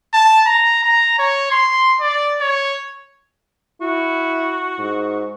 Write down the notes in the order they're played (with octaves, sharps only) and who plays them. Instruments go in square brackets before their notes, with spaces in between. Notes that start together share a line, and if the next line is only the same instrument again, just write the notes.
[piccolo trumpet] A5
A#5
A#5
C#5
C6
D5
C#5
[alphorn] E4 [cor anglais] F#4
[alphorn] G#2